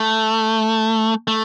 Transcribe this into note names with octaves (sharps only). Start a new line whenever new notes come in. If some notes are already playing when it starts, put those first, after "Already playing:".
Already playing: A3
A3